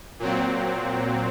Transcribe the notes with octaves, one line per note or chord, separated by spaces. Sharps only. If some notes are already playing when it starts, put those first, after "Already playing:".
A#2 F#3 C4